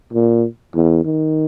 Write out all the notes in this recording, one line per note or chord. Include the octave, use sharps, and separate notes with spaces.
A#2
E2
D#3